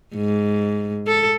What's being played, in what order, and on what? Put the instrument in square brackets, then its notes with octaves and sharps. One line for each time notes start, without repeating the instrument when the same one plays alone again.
[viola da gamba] G#2
A4